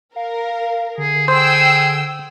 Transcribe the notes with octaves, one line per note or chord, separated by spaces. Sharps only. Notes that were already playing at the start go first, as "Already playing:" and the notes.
A#4 F5
D3 G#4
G#4 C5 G5 E6